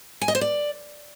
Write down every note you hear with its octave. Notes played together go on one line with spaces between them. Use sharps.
G#5
D#5
C5
D5